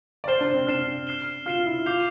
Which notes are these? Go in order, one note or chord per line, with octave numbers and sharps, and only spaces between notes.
D5
C5 F6 C7 E7 G7
D4
C4
D4 F6 C7 E7 G7
F6 C7 E7 G7
F4 F6 C7 E7 G7
E4
F4 D6 G6 C7 F7